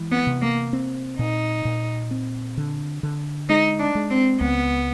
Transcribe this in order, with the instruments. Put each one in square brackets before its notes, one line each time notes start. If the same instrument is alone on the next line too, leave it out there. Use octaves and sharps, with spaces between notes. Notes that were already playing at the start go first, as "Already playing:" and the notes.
Already playing: [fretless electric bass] E3 G#3
[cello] B3
[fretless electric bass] C3
[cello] A#3
[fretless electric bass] C4
[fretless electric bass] A#2 [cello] D#4
[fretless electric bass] A#2
C4
D3
D3
[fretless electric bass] G#3 [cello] D#4
[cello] D4
[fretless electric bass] G#3
[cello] C4
[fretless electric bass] C#2 [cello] B3